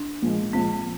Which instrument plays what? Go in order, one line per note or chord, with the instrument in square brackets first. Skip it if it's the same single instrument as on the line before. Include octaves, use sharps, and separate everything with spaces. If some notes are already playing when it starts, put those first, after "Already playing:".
Already playing: [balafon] D4
[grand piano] A#2 F3 G#3
[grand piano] A#2 F3 G#3 [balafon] C4